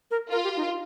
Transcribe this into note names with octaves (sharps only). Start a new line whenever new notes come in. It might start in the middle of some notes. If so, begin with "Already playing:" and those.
A#4
F4 A#4
G4
D#4